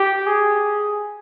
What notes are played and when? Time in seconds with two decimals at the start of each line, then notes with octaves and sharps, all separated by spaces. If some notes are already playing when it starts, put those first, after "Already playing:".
Already playing: G4
0.26 G#4